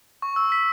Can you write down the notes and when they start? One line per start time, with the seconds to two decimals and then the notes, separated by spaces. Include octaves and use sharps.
0.22 C#6
0.36 E6
0.52 B6